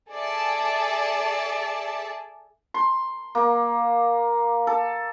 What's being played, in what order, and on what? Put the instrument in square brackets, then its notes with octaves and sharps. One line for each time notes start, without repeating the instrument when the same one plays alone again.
[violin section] G#4 A4 D5 E5 A5
[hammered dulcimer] C6
A#3
A4